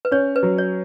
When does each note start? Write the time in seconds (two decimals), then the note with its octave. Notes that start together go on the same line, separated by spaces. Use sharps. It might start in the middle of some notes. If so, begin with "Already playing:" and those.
0.05 B4
0.11 C#4 C#5
0.36 B4
0.43 F#3
0.58 C#5